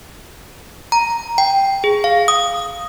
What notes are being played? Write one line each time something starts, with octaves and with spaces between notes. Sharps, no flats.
A#5
G5
G#4
F5
D#6